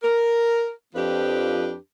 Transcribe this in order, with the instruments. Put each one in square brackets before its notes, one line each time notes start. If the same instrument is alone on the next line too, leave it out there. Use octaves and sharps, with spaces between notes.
[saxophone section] A#4
F2 F3 D4 G4 B4